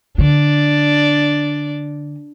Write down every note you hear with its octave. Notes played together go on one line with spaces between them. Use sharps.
D3 D4 D5